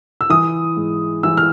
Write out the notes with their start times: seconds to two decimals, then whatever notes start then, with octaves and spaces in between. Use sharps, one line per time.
0.21 E6
0.30 E3 D#6
0.77 G#2
1.23 E3 E6
1.37 F6